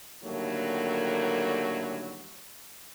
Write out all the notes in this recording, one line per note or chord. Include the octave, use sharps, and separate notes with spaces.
A2 D3 D#3 F#3 G3 A#3